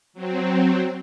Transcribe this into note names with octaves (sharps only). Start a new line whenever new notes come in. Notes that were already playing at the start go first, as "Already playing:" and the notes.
F#3 C4